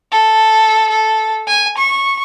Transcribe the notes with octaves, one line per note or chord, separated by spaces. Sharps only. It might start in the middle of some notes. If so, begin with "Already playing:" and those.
A4
A4
G#5
C#6